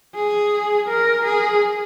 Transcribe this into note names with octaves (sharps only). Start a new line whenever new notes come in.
G#4
A#4
G#4